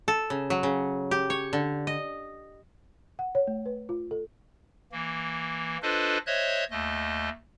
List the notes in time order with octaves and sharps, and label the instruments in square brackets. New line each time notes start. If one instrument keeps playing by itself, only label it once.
[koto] A4
C#3
F#3
C#3
G4
C#5
D3
D#5
[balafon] F#5
C#5
A3
B4
F4
A4
[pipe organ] E3 A#3
D4 F4 A4 B4 C5 D#5
C5 C#5 D#5 E5 F#6 G#6
D#2 A3 D#5